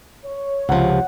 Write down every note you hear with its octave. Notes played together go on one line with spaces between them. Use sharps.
C#5
C#2 C3 F3 F#5